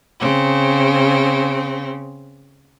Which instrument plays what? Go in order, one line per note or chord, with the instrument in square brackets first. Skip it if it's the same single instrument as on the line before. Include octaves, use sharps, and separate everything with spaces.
[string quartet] C#3 C4